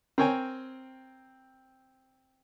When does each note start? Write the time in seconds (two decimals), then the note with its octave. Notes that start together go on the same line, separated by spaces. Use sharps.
0.18 C4 A#4 C#5 G5 G#5